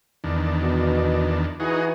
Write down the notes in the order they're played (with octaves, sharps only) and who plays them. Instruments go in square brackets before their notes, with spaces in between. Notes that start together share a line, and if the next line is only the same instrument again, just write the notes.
[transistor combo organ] E2 D#3 D4
[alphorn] B2
[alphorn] E3 [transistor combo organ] D#4 F#4 G#4